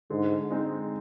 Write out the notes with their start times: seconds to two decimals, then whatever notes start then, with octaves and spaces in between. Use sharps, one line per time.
0.10 G#2 D3
0.51 G#3 C4 D#4